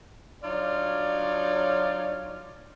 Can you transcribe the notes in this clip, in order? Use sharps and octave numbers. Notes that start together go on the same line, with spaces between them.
F#3 D4 D#4 F4 C#5 D5